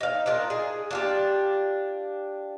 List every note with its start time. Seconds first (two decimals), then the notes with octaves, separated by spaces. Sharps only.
0.01 D#4 F5
0.26 D4 D#4 F4 A#4
0.50 G#4
0.91 D4 F4 G4